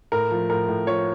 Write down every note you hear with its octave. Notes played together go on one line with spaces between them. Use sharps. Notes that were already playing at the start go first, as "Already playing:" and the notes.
A2 A#4
F3
A2 A#4
A2
F3 C#5